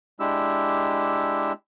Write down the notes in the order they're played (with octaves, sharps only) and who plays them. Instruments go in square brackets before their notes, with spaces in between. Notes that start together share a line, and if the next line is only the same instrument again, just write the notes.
[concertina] G#3 D4 E4 G4 E6